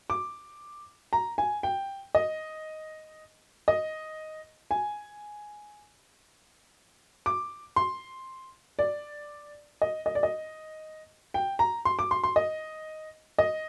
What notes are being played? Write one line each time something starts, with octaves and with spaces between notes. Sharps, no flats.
D6
A#5
G#5
G5
D#5
D#5
G#5
D6
C6
D5
D#5
D#5
D5
D#5
G5
A#5
C6
D6
C6
C6
D#5
D#5